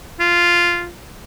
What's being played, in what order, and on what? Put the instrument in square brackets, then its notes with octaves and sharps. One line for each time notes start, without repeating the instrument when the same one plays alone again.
[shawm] F4